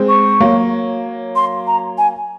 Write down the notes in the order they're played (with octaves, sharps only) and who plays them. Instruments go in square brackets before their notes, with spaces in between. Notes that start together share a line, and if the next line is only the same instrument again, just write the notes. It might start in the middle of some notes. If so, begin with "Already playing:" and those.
Already playing: [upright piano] G#3 C4
[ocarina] C#6
[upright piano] F#3 A#3
[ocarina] C6
A#5
G#5